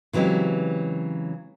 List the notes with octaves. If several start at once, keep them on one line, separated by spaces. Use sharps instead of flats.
C#3 E3 F#3 G#3 C4 G4